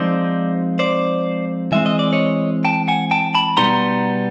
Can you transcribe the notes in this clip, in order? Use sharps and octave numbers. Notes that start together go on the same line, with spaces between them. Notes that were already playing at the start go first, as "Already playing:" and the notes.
Already playing: F3 G#3 C4 D#4 C5 D5
C5 D5
E3 G#3 C4 E5
D#5
D5
C#5 D#5
G5 A5
F#5 G#5
G5 A5
A5 B5
B2 G3 B3 D#4 A#5 C6